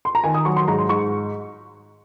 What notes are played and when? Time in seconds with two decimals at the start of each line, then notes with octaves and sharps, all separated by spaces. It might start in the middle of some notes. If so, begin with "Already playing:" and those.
0.05 C6
0.15 A#5
0.24 D#3 G#5
0.34 D#6
0.45 F#3 C#6
0.57 C6
0.68 G#2 A#5
0.79 C6
0.89 G#2 C#6